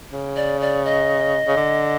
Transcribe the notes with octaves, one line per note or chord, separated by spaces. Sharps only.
C#3
D5
D5
D#5
C#3
D3